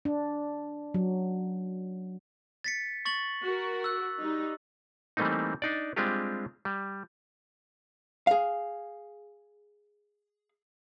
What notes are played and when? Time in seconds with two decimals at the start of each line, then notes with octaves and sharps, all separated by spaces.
0.05 D4
0.94 F#3
2.64 A6 B6 C#7
3.05 C#6 A6 F#7
3.43 F#4 A#4
3.84 E6 F#6
4.21 G3 D#4
5.17 E3 G3 A3 A#3 C4 D#4
5.62 D4 D#4 D5
5.96 G3 G#3 C4 D4 F4 G4
6.65 G3
8.27 G#4 F5